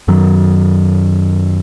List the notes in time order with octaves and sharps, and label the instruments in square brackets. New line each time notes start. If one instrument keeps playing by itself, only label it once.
[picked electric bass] F#2 D#3 F#3